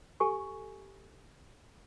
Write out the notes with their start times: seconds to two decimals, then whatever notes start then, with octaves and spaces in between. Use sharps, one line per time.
0.20 G4 A4 G#5 C#6